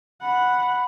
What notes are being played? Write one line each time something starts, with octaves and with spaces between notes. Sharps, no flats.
F#5 B5